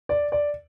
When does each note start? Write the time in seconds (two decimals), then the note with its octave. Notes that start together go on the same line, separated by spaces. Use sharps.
0.09 D5
0.32 D5